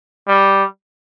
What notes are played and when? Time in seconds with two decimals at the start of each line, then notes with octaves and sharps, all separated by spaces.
0.28 G3